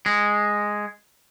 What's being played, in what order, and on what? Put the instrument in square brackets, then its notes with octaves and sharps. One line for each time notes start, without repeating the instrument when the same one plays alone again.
[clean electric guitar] G#3